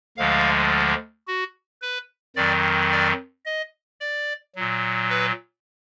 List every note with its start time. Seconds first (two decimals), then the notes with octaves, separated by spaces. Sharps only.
0.17 D2 D3 F3 G#3 F5
1.27 F#4
1.82 B4
2.36 F2 D#3 F#3 D5
2.91 D5
3.45 D#5
4.01 D5
4.55 A#2 F#3
5.10 B4